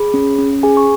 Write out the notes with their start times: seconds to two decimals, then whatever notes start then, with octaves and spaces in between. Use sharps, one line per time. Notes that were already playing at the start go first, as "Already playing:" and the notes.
Already playing: G#4 B5
0.14 C#4
0.38 C#4
0.63 G#4 G#5
0.77 C#6